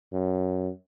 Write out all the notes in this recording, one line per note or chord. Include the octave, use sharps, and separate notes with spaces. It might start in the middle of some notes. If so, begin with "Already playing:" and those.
F#2